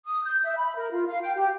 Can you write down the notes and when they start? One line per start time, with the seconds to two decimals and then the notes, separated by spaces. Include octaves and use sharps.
0.05 D#6
0.24 G6
0.45 E5
0.58 B5
0.77 A#4
0.91 F4
1.07 F5
1.22 G5
1.36 G4